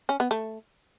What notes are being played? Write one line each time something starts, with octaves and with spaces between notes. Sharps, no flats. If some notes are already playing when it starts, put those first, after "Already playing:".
C#4
B3
A3